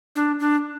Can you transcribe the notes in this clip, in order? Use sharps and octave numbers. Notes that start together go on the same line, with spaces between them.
D4
D4